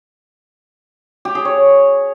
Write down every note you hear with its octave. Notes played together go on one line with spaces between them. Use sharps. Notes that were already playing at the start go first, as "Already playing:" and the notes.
G4
G#4
C#5